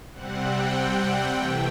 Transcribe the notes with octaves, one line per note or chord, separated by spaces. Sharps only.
C3 G3 C4 F#5
G5
F#5
C3 E3 A3 G5